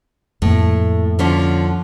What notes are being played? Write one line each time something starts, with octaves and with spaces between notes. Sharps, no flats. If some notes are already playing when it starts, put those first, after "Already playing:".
F2 A2 A#3
D3 F3 C#4